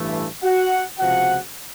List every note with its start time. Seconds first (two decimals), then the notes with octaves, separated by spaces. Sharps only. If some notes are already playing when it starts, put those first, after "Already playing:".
Already playing: A1 G2 E3 A3
0.43 F#4 F#5
0.99 C#2 C3 F3 F#4 F#5